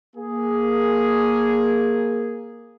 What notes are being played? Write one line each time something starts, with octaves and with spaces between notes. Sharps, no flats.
A#3 G#4